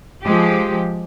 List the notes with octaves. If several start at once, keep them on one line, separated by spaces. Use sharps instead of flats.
F3 G#3 G4